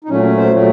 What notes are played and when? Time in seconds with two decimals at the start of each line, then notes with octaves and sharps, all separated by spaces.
0.04 D#4
0.09 A#2 F#3 A3 C#4
0.23 C#4
0.37 C5
0.52 A#2 F#3 A3